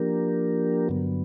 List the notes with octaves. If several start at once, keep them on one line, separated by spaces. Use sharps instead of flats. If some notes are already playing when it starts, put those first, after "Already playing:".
Already playing: F3 A#3 D4 G4 A#4
G2 D3 F#3 B3